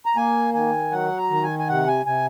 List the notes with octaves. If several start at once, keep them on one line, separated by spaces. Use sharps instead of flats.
A#5
A#3 G#5
D#3 G#5
F#3 F#5
A#5
D#3
G#5
G#5
C3 F#5
G#5
C3 G#5